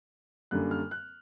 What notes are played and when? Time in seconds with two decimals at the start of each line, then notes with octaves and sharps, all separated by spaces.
0.51 F#2 D3 G3 A#3 F#6
0.71 F6
0.91 F#6